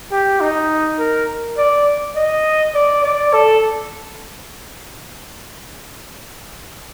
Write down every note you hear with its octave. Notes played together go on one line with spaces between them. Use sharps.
G4
D#4
A#4
D5
D#5
D5
D5
A4